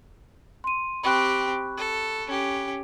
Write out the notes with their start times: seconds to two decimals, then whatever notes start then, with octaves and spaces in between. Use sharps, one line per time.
0.64 C6 D#7
1.03 C4 G4 B5 C#6 F#6
1.77 A4
2.27 C#4 G4